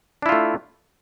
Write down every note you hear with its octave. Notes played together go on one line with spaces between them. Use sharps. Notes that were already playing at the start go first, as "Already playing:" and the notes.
A3 D4 E4 F4